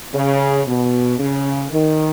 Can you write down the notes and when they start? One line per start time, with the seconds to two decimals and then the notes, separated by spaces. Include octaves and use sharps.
0.14 C#3
0.67 B2
1.19 C#3
1.72 D#3